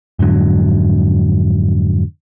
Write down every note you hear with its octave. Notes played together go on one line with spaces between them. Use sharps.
F2 G#2 D3 F#3